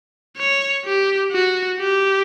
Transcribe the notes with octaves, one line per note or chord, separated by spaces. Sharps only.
C#5
G4
F#4
G4